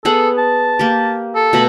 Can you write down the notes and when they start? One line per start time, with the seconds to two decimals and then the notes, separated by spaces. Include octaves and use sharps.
0.05 B3 G#4 A4 F#5
0.38 A5
0.79 A#3 G4
1.35 A4
1.53 B2 A3 B5